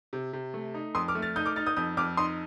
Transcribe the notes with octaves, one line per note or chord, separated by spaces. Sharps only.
C3
C3
A3
D#4
F2 C6 D#6
D6 F6
A3
F6 A6
D#4 D#6 G6
D6 F6
D#4 F6 A6
D#6 G6
F2 D#6 G6
F2 D6 F6
D#4 C6 D#6